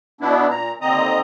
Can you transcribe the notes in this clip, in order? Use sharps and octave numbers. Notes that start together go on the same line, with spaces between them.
B2 B3 D4 E4
A#2 A#5
D#2 D3 C4 D#5 A#5 D#6